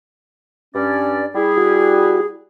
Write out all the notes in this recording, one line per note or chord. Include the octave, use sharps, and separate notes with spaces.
G2 C#4 D5
G3 E4 G#4
F#4